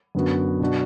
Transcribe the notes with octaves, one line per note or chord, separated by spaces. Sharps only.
F#2 D3 B3 F#4
B2 F#3 D4 F#4